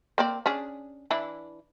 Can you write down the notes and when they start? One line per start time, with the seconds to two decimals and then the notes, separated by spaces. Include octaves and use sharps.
0.18 A#3 C4 D5
0.46 C#4 D4 G#4
1.10 E3 D4 E4